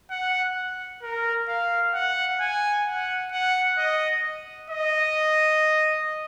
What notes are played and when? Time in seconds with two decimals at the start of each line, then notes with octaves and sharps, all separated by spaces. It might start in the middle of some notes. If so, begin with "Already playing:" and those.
0.10 F#5
1.02 A#4
1.48 F5
1.94 F#5
2.40 G#5
2.86 F#5
3.32 F#5
3.78 D#5
4.70 D#5